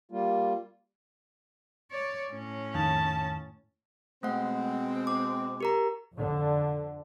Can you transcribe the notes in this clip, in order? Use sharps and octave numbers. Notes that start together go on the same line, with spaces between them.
G3 A#3 F4
C#5 D5
A2 C#4
F2 D#3 A5
B2 G#3 A3 C4 F#5
D6
G4 A#4 A#5
F2 D3